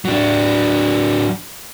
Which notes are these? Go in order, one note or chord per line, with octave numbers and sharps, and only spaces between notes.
F#3 D4